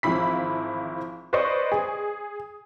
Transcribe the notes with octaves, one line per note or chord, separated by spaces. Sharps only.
G#1 E3 F3 E4 B5 B6
B4 C5 D5 D#5 C#6
G#4